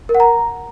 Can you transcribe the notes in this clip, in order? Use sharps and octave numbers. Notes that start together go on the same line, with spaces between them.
A#4
F#5
A#5